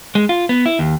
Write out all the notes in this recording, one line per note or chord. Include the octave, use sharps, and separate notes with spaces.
G#3
F4
B3
E4
D#2